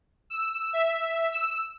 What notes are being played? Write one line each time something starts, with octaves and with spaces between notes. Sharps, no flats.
E6
E5
E6